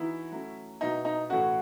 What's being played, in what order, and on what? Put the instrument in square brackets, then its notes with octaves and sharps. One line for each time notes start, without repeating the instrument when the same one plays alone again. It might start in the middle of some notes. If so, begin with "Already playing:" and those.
Already playing: [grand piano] E3 B3 D#4 F#4 [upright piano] E4
[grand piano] F#3 A3 C#4
[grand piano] B2 F#3 B3 E4 [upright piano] D#4
[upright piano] D#4
[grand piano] A2 E3 A3 C#4 [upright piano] F#4